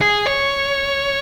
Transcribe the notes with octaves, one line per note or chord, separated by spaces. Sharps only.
G#4
C#5